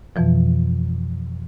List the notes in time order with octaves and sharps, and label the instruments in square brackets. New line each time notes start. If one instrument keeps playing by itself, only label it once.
[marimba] F2 B2 E3 F3